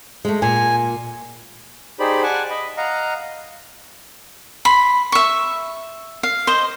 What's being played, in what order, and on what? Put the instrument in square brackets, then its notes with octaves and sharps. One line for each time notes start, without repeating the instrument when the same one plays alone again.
[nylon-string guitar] G#3 A3
[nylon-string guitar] A#2 [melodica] G#5
[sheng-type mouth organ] D#4 G4 G#4 C5 D5 B5
D5 F#5 G#5 A5
D#5 B5
D#5 F5 F#5 A#5
[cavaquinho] B5 C6
E5 C#6
F5
C5 D#5